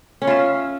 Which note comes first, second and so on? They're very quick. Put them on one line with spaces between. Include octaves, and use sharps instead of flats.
C#4 C#5 F4 E5